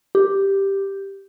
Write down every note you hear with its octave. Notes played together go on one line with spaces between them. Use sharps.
G4